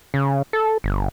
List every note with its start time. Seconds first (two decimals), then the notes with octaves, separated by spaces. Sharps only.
0.14 C#3
0.53 A4
0.84 G1